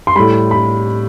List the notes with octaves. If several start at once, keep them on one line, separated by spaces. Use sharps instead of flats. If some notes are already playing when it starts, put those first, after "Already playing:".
C6
A2 G3 B5
B5